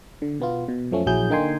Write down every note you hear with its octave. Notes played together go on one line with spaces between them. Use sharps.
D3
B2 B3 F4
B2
F#2 F3 A3 C#4
A#1 F#3 E4 G#4 G6
D3 A#3 D#4 G5 G#5 C6